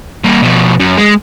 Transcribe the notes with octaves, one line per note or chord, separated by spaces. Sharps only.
G3 A#3
B2 F3
F#2
G#3